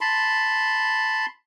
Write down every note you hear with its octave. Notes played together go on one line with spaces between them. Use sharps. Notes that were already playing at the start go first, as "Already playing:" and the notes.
A5 B5 C6